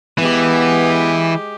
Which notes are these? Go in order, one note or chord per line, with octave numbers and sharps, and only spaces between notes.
E3 G#3 B3 G4